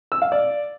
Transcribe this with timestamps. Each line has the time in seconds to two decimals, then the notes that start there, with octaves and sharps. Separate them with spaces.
0.12 E6
0.22 F5
0.32 D5